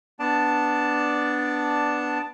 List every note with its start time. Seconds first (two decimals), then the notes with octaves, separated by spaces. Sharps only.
0.19 B3 D4 D5 A5